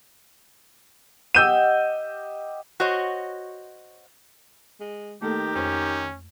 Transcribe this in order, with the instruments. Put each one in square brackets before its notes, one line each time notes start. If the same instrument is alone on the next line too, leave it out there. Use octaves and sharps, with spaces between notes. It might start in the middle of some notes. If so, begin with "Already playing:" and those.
[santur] G4 D#5 F#5 [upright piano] E6 G6 D#7
[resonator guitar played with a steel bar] F#4 C5 C#5 D#5
[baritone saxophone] G#3
[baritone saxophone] D#3 [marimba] A3 A#3 A4 [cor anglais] G4
[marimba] F2 C5 [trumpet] C#4